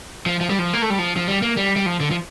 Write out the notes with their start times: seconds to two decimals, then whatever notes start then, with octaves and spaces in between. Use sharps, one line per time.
0.26 F3
0.41 F3
0.50 G3
0.59 F3
0.73 A#3
0.82 A3
0.90 G3
0.99 F3
1.16 F3
1.28 G3
1.42 A#3
1.57 G3
1.76 G3
1.86 F3
2.00 D3
2.11 F3